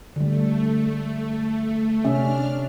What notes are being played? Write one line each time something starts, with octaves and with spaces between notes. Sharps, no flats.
D3 G3 A3
C3 C#4 D4 E5 F6